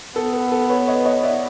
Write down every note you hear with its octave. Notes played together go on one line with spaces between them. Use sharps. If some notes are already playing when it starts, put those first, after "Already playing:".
B3 A4
A4
A4
B4 C#5
C#5 D#5
C#5 D#5
D5 E5